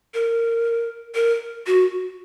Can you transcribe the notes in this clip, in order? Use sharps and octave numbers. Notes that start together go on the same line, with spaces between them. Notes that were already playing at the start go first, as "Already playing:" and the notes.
A#4
A#4
F#4